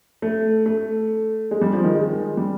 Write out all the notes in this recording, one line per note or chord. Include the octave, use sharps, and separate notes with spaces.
A3
A3
G#3
G3
F3
D#3
G#3
G3